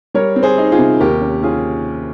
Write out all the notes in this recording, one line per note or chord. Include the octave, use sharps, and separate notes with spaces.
G3 A#4 C#5
C4
G#4 C5
D#4
F4 G#4
C3
D#2 G4 A#4
C#4
C#4 F4 G#4